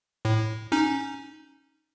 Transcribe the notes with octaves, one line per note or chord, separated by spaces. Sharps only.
A2
C#4 D#4